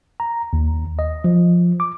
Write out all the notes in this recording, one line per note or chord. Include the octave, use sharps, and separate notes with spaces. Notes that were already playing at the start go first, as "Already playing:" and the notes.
A#5
D#2
D#5
F3
D6